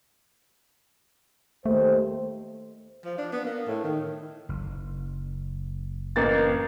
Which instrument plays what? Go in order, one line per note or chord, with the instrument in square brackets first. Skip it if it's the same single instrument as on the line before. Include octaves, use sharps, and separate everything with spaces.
[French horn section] D#2 C5 [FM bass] A3
[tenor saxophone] F3
D4
B3
A#3
A2
D#3
[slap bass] F#1
[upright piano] A1 A#3 A6